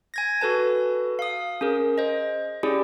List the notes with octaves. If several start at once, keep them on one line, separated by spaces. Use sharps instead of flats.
G#5 G#6 A#6
F#4 A4 B4 A5
F5 D#6
C#4 G#4 A#4
C5 D#5
C#4 E4 G4 G#4 D5